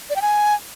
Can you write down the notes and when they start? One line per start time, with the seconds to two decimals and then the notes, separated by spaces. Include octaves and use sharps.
0.10 D5
0.16 G5
0.22 G#5